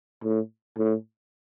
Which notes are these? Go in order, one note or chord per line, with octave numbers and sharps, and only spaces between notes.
A2
A2